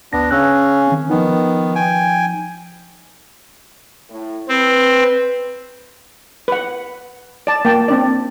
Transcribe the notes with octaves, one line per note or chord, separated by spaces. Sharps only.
G#1 D2 B3 D4 A#6
C#3 C#4 G#5 E6 F#6
D#3 C4
D#3 F3 B3 D#4
G5 G#5
A2
C4 B4
B4 F#5
D5 A5
A#3 G5 A5
C4 D4 D5